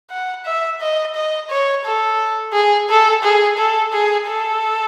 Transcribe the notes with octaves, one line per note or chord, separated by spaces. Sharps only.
F#5
E5
D#5
D#5
C#5
A4
G#4
A4
G#4
A4
G#4
A4